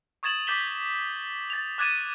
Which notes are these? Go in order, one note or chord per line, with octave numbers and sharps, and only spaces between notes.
C#6 D#6 G#6 A6 E7 F#7
D6 G6 A6 B6 E7 G7
A6 F7
D6 F#6 G#6 A6 D#7 E7